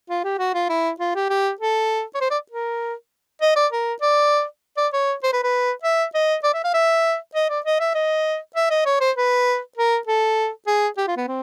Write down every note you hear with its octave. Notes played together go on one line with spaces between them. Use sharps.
F4
G4
F#4
F4
E4
F4
G4
G4
A4
C#5
C5
D5
A#4
D#5
D5
A#4
D5
D5
C#5
C5
B4
B4
E5
D#5
D5
E5
F5
E5
D#5
D5
D#5
E5
D#5
E5
D#5
C#5
C5
B4
A#4
A4
G#4
G4
F4
B3
C4